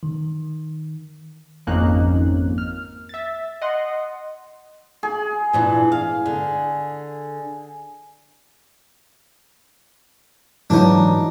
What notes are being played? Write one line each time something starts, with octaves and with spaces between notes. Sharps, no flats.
D#3
G#1 F2 A#3 C#4 D#4 F#6
F6
E5 A6
D#5 F#5 C6
G#4
A#2 E3 D4
F5
D3
G#2 E3 F#3 D4 D#4